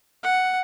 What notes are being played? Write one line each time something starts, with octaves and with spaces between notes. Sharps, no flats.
F#5